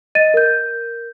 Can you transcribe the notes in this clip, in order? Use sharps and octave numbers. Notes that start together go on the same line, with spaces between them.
D#5 A6 D#7
A#4 G6